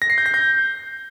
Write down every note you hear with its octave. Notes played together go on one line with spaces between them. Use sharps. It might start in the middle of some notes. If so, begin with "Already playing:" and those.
A#6
C7
G6
A#6
G6